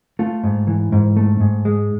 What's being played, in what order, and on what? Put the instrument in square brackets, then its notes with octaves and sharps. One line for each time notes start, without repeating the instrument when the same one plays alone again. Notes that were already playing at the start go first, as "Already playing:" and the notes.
[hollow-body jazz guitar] A3 F4
G#2
E3
G#2
A3
G#2
G#3